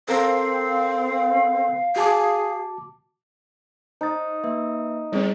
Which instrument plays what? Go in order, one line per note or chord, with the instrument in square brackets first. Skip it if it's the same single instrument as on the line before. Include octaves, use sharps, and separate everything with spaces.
[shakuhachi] C4 [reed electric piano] A4 A#4 C5 [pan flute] F5
[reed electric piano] F#4 A5 D6 [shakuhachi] G#4
[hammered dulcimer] D#4 [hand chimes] C5 A6
[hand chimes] A#3 B4 E5
[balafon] G3 C4 [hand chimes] E4 G#4 C5